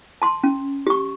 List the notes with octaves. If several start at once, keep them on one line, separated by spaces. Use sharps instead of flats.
A5 C6
C#4
G4 C#6